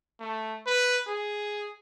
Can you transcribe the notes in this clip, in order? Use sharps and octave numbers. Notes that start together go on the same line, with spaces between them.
A3
B4
G#4